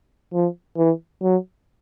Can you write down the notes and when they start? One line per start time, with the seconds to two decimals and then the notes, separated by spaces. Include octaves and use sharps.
0.33 F3
0.77 E3
1.23 F#3